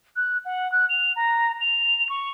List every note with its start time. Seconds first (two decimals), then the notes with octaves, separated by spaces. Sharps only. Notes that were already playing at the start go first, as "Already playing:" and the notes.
0.16 F#6
0.45 F#5
0.72 F#6
0.89 F7
1.16 A#5
1.61 F7
2.09 C#6